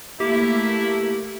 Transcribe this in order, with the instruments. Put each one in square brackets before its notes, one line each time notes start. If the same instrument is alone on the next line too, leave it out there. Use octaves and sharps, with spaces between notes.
[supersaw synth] A3 A#3 [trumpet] E4 [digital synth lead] G4